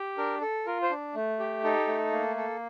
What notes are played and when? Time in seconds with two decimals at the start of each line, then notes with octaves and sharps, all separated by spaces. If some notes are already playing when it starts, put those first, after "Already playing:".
Already playing: G4
0.18 D4 A#4
0.41 A4
0.66 F4 A#4
0.82 C5
0.91 D4
1.15 A3
1.39 G4
1.64 D#4 A4
1.87 A3
2.12 A#3
2.37 A4